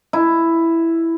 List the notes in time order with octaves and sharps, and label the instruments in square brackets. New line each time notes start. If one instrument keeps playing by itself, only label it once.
[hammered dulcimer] E4